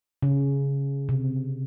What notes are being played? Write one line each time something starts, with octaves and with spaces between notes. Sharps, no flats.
C#3
C3